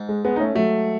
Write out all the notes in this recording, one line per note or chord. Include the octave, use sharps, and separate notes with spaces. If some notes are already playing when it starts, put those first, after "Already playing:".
Already playing: G#2
G#3
G#3 B3
D#4
A3 C#4
F#3 A3